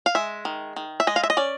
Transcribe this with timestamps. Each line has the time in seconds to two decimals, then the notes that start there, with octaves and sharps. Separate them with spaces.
0.06 F5
0.15 G#3 E5
0.45 D#3
0.76 D#3
1.00 E5
1.07 G#3 D#5
1.16 F5
1.23 E5
1.30 D#5
1.37 C#4 D5